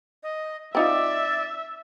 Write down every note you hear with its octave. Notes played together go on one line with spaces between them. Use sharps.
D#5
C4 D#4 F4 D5 E5